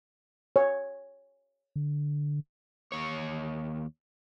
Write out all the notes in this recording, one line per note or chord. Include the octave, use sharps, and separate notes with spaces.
C#5
D3
D#2 C#5